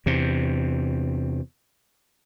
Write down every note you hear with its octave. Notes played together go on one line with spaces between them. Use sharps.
E2 C3